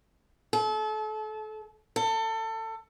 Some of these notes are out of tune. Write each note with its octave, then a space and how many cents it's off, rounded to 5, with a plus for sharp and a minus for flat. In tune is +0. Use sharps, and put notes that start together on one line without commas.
A4 -35
A4 +25